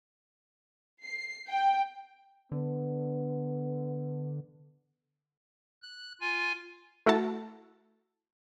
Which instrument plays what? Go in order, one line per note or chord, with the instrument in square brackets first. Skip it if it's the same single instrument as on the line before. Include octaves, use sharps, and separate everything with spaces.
[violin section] C7
G5
[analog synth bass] D3 [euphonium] B3
[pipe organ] F#6
F4 G#5
[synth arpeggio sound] A3 E4 F#4 A4 A5